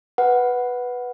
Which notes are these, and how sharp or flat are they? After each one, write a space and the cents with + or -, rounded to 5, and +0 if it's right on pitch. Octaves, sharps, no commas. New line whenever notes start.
B4 +0 F#5 +0